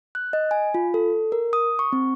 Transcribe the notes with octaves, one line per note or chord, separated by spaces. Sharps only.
F#6
D#5
G#5
F4
A4
A#4
D#6
C#6
C4